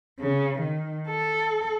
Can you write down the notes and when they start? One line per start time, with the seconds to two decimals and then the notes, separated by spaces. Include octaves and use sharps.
0.19 C#3
0.59 D#3
1.09 A4